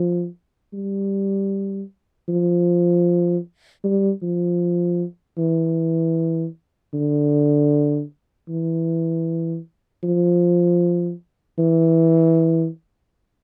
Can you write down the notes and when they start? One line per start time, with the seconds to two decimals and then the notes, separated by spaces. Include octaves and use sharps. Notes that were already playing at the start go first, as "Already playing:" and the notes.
Already playing: F3
0.73 G3
2.29 F3
3.84 G3
4.22 F3
5.38 E3
6.94 D3
8.49 E3
10.03 F3
11.59 E3